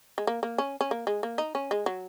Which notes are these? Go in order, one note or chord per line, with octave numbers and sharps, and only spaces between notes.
G#3
A#3
A#3
C#4
C#4
A#3
G#3
A#3
D#4
C#4
G#3
F#3